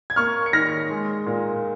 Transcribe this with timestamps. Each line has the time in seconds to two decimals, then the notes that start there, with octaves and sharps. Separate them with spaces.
0.10 G#6
0.16 A#3 C#6 F6
0.46 C#7
0.53 D#3 F6 A#6
0.90 G#3
1.26 A#2